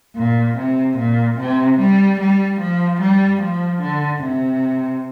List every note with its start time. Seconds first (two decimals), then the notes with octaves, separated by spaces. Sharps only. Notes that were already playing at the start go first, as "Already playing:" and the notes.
0.16 A#2
0.58 C3
0.98 A#2
1.39 C3
1.80 G3
2.20 G3
2.60 F3
3.01 G3
3.42 F3
3.82 D3
4.23 C3